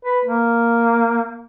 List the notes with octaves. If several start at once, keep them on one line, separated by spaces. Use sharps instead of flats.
B4
A#3